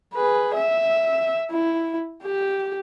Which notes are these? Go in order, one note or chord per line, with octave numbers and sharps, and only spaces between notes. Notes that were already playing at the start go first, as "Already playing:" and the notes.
G#4 B4
E5
E4
G4